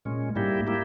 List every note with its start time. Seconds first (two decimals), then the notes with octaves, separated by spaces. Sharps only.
0.05 A#2 G#3 C#4
0.36 G#2 G3 A#3 E4 G4
0.67 A#3 E4 G4